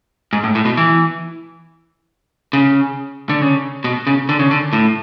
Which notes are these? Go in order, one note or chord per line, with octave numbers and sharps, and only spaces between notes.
G#2
A2
A2
B2
E3
C#3
D3
C#3
B2
C#3
D3
C#3
D3
A2